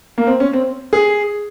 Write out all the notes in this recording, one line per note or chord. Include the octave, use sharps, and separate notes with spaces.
A#3
C4
C#4
C4
G#4